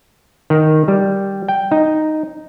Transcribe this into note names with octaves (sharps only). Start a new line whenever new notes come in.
D#3
G3
G5
D#4